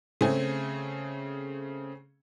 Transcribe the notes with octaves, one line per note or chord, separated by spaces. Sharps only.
C#3 A3 C4 G#4